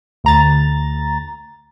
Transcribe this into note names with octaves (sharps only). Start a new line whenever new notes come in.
D2 A#5 A6